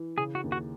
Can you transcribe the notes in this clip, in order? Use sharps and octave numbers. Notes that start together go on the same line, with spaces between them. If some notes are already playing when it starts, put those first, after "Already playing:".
Already playing: E3
C#3 G#4
F#4
D#2
F#4